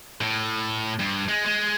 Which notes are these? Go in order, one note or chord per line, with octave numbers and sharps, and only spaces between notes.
A2
G2
G#3
G#3